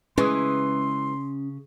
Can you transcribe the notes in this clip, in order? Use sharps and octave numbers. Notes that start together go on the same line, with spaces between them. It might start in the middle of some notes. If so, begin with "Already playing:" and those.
C#3 E3 G#3 C#4 C6 D#6